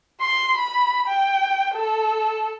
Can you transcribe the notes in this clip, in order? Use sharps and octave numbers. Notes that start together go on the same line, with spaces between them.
C6
B5
G5
A4